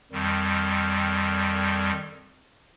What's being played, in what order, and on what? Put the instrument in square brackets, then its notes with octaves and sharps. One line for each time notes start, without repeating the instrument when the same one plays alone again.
[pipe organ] F2 D#3 G3